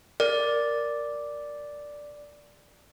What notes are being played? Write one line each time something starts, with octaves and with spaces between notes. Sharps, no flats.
A#4 D5